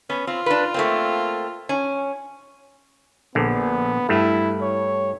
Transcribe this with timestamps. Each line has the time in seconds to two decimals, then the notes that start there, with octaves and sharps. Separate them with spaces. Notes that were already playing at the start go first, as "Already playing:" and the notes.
0.10 B3 C#4
0.27 C4 F4
0.46 D4 B4
0.74 A3 A#3 C4
1.69 C#4
3.35 A#1 D3 B3
4.09 G2 A3 E4
4.61 C#5